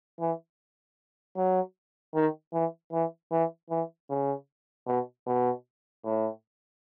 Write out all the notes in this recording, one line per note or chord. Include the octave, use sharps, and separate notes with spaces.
E3
F#3
D#3
E3
E3
E3
E3
C#3
B2
B2
A2